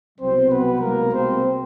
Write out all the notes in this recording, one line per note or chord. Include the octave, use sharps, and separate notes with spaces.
C2 B2 F#3 C4 C5
B3 B4
C2 B2 G#3 A#3 A#4
C4 C5